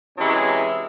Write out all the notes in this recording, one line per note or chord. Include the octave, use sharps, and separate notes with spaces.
C3 E3 F#3 G#3 C#4 E4